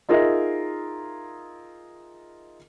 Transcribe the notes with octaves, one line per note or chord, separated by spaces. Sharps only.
D#4 F4 G#4 A#4 D#5 E5